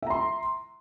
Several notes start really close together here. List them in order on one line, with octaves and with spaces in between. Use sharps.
E5 A#5 C6